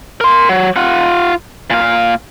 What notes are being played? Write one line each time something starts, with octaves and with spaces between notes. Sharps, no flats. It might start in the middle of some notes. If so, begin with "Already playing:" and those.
A#4 C6
F#3
F4 F#5
A#2 F5